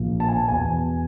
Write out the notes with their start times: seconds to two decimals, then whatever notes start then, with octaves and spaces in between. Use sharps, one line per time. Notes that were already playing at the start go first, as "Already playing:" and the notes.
Already playing: A#1 A#2 F3
0.20 A5
0.29 G#5
0.37 A5
0.48 E2 B2 G#5